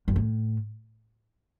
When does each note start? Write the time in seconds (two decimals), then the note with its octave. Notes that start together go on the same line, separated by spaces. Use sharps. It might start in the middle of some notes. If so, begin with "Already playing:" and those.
0.08 F#2
0.16 A2